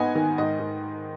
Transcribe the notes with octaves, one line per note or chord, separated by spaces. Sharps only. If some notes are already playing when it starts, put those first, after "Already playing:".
Already playing: G#2 B3 D#4 D#5 F#5 G#5
D#3
G#2 D#5
G#2